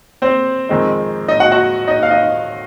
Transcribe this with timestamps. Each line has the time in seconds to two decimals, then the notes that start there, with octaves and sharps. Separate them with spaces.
0.22 C4 C5
0.69 F2 D#3 G#3 C4 D#4
1.28 D#4 D#5
1.40 F#4 F#5
1.52 F#4 F#5
1.87 D#4 D#5
2.03 F5
2.11 D#4 D#5